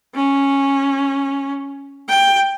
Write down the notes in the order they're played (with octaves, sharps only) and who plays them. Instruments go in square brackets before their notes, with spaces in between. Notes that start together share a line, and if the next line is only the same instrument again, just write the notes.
[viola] C#4
G5